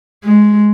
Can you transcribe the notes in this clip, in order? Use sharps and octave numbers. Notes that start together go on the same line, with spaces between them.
G#3